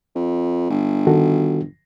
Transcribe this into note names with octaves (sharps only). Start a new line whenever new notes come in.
F2
G1
D#3 F#4 A4